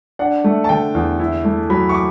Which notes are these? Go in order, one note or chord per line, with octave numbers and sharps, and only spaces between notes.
D4 F#5
A3
A5
D3 G5
E2
E4
A3
F#3 B5
C#6
D6